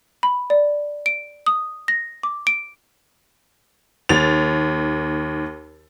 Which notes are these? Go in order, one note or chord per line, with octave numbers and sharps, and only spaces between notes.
B5
D5
D7
D#6
A#6
D6
D7
D#2 A6 F7